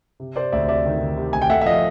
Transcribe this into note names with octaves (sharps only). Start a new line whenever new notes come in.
C3
C3 C5 D5
D2 D5 E5
C3 D5 E5
D#3
D#3
C3
D2 G#5
G5
A3 E5 F#5
E5
F3 D#5 F5